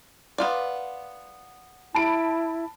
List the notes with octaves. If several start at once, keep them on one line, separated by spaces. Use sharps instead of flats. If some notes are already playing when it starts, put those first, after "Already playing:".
B3 F4 D5
E4 A5 B5 D7